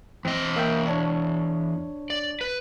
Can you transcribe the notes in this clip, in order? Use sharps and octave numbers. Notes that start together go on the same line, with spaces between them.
E2 C4 D#5
A#3 E5 G5
D4 C#5
D5
B4